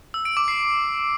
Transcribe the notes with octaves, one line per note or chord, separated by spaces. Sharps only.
E6
D7
D6
C7